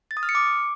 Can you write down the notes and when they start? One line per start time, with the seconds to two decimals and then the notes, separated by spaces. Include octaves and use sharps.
0.11 A6
0.17 D#6
0.23 F6
0.29 C#7
0.35 D6